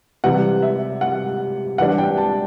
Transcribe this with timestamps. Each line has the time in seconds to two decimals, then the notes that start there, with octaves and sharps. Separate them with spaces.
0.24 C3 E3 G3 F#5
0.62 E5
1.01 F#5
1.78 E3 G3 D4 F#5
1.98 G5
2.17 A5